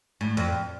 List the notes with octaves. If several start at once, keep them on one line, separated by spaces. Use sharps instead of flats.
A2
F2